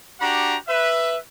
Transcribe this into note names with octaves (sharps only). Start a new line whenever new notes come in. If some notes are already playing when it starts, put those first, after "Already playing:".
D4 F#4 G4 F#5 A#5
B4 E5